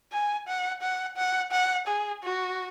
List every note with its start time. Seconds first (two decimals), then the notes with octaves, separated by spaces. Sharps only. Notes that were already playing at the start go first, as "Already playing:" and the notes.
0.12 G#5
0.47 F#5
0.82 F#5
1.17 F#5
1.52 F#5
1.87 G#4
2.23 F#4